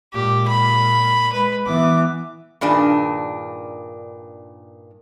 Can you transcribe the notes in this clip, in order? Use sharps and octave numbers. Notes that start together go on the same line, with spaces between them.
A#2 G#3 G4
B5
G#3 B4
E3 B3 D6
G2 A#2 D#3 D4 G#4